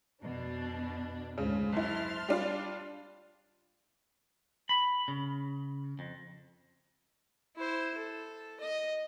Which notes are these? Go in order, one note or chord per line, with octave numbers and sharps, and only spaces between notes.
F2 B2 D4
D2 G#2 C#3 F3
F#1 E4 A5 C6 F6
G3 D4 F4
B5
C#3
F2
E4 C5
A4
D#5